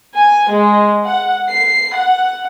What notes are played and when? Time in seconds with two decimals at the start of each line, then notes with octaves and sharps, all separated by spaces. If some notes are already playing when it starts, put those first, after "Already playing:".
0.15 G#5
0.51 G#3
1.07 F#5
1.49 C7
1.93 F#5